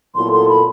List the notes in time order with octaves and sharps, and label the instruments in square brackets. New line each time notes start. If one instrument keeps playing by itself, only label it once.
[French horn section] A#2 F#3 B3 E4 A4 [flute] C6
[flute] C6
B5